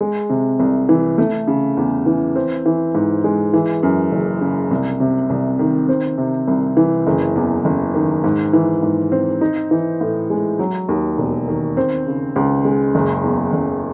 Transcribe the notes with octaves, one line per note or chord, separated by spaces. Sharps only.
G#3
C3
C2
E3
A3
C#3
E2
E3
C4
E3
G#2
G#3
E3
F#2
F#1
C#3
C2
C3
C2
D#3
C4
C3
C2
E3
F#1
E2
F#1
D#3
G#2
E3
G#2
C4
D#4
E3
A2
G#3
F#3
D#2
E1
D#3
C4
C#3
C#2
G#3
F#1
E2
F#1